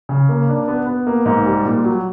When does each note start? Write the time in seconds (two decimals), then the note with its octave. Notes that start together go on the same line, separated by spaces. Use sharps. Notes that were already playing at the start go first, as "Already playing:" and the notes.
0.09 C#3
0.29 A#3
0.49 D4
0.68 B3
0.87 B3
1.07 A#3
1.26 G#2
1.45 G3
1.65 A#2
1.84 F#3